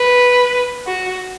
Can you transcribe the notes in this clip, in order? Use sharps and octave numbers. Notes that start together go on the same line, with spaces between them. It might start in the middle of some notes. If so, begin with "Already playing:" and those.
Already playing: B4
F#4